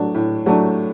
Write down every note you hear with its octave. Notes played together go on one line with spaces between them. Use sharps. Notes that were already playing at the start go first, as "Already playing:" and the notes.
Already playing: A2 F#3 A3 D4
A2
F#3 A3 D4